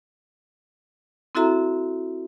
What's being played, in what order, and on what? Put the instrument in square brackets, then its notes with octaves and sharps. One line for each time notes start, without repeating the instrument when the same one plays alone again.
[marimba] C4 E4 F#4 A4 E5 A#5